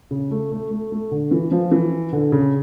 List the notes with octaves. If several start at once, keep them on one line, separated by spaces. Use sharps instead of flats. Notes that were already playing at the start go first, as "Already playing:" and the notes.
C#3
A3
A3
A3
A3
D3
E3
F3
E3
D3
C#3